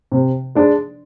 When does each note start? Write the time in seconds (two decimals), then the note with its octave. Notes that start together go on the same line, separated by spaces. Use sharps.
0.12 C3
0.55 G#3 D4